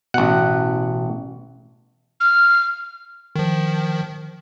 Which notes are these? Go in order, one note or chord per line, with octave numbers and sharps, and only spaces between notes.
A1 B2 F#5
F6
D#3 F3